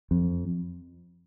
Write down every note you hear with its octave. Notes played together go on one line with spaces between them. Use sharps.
F2